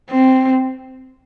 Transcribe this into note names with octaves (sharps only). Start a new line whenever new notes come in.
C4